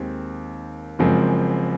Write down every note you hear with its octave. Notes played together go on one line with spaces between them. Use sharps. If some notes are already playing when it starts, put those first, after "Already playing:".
Already playing: D#2 D#3 G#3 C4 D#4
F#1 F#2 F3 G#3 C4